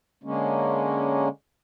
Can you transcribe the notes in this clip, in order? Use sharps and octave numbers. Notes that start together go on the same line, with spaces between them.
D3 G#3 A#3 C#4